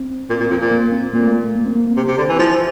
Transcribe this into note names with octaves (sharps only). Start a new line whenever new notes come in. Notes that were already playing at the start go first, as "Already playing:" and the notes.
Already playing: C4
A#2
A#2
F2
A#2
A#3
C4
A#2 A#3
A3
A3
A#3
C4
A#3
A#3
C3
C3 C4
D3
E3
F3 E4